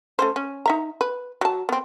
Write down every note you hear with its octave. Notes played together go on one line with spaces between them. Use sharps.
A3 C#4 C5
C#4
D#4 E5 A#5
B4
F#3 A5
B3 C4